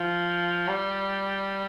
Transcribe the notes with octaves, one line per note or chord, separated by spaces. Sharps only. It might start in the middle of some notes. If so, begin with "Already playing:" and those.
Already playing: F3
G3